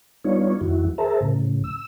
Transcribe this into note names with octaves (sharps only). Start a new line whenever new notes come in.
G3 B3 D4 D#4 F4 C#5
F2 D#3 E4 F#4
G#4 A#4 C5 E5 A5 A#5
A2 C#3
E6